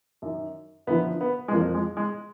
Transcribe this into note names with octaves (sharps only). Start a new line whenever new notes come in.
F#2 D#3
F#2 D3 F3 B3
B3
G#3
F2 F3 A#3
G#3
G#3